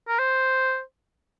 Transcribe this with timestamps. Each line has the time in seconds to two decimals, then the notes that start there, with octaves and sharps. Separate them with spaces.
0.08 A#4
0.19 C5